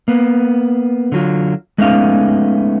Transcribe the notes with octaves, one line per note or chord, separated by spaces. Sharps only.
A#3 B3
D3 F#3 F4
G#3 A3 B3 C#4 D#4 F5